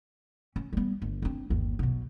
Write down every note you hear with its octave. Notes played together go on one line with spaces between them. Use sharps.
C#4
G3 B3
G1
C4 D4
G1 D#2
B1 B2